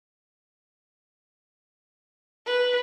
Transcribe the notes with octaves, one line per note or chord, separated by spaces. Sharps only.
B4